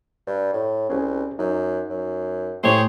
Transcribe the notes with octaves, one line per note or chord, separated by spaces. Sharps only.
G2
A2
C2 C#4 G#4
F#2 D#4
F#2
A2 A3 G4 G#4 C5 C#5